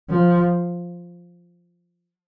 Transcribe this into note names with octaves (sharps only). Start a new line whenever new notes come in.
F3